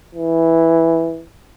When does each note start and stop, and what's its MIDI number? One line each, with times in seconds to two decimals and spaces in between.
0.15 1.23 52